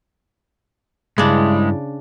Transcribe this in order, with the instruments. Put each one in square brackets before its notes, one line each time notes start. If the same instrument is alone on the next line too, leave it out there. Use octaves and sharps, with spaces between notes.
[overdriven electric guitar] G2 [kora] C#3 D4 [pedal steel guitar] G#3 [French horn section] E4